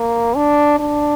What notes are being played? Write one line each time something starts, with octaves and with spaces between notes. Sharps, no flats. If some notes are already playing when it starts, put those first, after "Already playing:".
Already playing: A#3
D4
D4